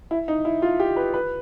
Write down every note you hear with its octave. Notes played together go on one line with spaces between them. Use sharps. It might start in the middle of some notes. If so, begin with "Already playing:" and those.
E4
D#4
E4
F4
G4
B4
B4